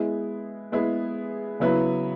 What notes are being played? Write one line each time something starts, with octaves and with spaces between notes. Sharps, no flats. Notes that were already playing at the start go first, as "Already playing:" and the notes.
Already playing: G#3 B3 E4 G#4
G#3 B3 E4 G#4
C#3 F#3 B3 E4 B4